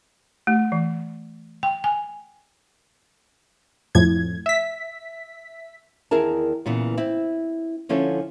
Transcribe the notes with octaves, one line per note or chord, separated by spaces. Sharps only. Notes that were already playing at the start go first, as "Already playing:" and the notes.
A3
E3
G5
G#5
F2 A2 G#6
E5 B6
E2 D#3 E4 G#4 A#4 A5
A#2 C#3 E3 B3
C4 E4
D3 F3 C#4 E4 A4 C#5